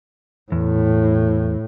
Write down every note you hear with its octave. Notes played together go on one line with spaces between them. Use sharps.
E2 A2